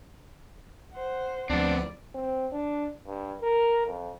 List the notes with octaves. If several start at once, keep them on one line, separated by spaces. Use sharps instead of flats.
C5 F#5
D2 F3 B3 C4 D4 D5
C4
D4
G2
A#4
F2